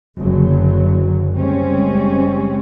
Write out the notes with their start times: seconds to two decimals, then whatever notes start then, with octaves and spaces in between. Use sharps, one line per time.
0.17 F#1 D3 F#3
1.35 F#1 G3 G#3 C4 C#4